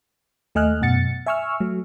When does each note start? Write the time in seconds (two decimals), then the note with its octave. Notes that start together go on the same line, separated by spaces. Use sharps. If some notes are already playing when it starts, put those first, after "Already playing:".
0.55 D#2 A3 D#5 G#5 F6 F#6
0.81 F#2 B2 F#5 A6 C#7
1.26 E5 G#5 C#6 E6 F6
1.60 F#3 A3